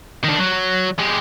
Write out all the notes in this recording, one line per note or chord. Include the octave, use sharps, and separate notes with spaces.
D#3 D4
F#3
G#3 G4